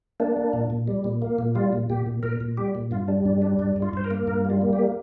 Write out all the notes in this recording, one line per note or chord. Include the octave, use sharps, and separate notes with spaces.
A#3 D4
A#3
A#2
A#2
G3
A#2
A#3
A#2
G3 F4
A#2
A#2 G4
A#2
A#2 A#4
A#2
G3 G4
A#2
G2 F4
G3 D4
G2 D4
G3 D4
G2 D4
G2
F4
G2 C5
A#4
A#3
G2 A#4
G3
F4
A#3
G4
A#3